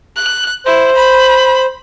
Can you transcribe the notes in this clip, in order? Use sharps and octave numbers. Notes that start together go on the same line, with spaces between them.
F#6
E4 C5
B5